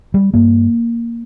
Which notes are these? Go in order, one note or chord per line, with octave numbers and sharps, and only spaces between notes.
G3
G2 A#3